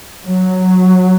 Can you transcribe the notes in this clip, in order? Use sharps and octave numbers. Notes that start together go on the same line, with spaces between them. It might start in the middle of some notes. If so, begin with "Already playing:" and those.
F#3